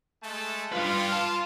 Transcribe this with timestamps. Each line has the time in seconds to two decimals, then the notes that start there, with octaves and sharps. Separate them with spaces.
0.23 G#3 A3 A5
0.72 G3 F4 B4
1.13 A5